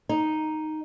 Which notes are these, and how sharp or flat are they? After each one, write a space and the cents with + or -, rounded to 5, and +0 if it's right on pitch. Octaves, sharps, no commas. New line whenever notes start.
D#4 +0